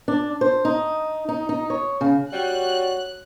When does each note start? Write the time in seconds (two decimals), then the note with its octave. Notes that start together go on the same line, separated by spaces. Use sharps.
0.08 D4
0.41 C5
0.65 D#4
1.29 D#4
1.49 D#4
1.70 C#5
2.01 C#3
2.33 G3 F#4 C#5 F#6